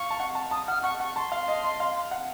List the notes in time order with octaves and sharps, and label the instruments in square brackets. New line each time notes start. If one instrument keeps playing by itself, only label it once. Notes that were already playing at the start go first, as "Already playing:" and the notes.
Already playing: [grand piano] F5 [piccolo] C#6
[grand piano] A5
F#5
A5
[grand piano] A5 [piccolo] D#6
[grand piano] F#5 [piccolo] F6
[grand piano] F#5 [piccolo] C#6
[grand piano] F#5 [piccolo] C#6
[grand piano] A5 [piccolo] C6
[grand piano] F5
D#5
D#5
F5
F#5